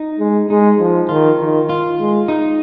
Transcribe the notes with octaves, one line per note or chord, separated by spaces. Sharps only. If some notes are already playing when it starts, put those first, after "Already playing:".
Already playing: D#4
G#3
G#3 D#4
F3
D#3 F4
D#3
F4
G#3
D#4